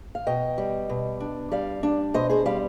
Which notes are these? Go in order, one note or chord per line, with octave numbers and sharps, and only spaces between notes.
F5
B2 D#5 G5
G3
B2
D4
G3 D5 F5
D4
B2 C5 D#5
G#4 C5
G3 D5 F5